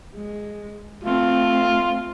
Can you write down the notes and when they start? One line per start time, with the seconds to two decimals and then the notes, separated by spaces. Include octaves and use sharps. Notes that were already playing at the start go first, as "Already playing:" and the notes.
0.16 G#3
1.04 A3 C4 F4